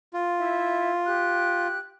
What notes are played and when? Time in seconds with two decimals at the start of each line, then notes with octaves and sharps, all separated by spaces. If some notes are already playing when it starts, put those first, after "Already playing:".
0.13 F4
0.37 E4 E5
1.06 G4 F#6